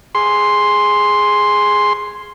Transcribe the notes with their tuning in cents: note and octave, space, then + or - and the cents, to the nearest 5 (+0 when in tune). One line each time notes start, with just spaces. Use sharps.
G#4 +0 C6 +0